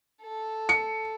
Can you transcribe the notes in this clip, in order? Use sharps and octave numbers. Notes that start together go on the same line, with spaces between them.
A4
C#7